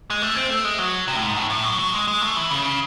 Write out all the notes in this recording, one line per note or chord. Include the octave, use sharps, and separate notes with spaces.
G#3
A3
C4
A3
G#3
F#3
C3
A2
G#2
A2
A2
F#3
F#3
G#3
G#3
A3
E3
C#3